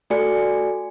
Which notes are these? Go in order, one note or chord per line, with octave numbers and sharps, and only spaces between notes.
A3 F#4 A4 D5 G#5 C#7